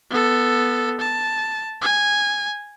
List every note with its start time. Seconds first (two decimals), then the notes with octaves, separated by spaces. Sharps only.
0.10 B3 A4
1.01 A5
1.82 G#5